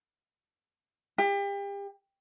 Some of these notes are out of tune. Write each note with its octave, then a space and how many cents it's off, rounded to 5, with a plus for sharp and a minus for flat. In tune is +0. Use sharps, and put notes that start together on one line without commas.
G4 +35